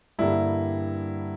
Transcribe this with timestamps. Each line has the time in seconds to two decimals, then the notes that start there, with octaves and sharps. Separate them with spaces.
0.19 G2 D3 G3 A#3 E4